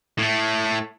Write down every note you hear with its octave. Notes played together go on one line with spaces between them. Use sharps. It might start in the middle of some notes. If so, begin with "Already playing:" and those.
A2 A3